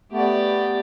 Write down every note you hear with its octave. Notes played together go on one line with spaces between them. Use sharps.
A3 B3 G4 D5